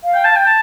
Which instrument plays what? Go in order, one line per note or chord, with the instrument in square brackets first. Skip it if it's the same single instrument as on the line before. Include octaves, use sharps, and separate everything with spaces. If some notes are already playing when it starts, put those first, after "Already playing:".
[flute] F5
[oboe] G5
A5
G5
A5